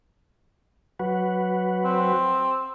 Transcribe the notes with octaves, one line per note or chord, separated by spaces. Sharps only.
F#3 F#4 B4
C4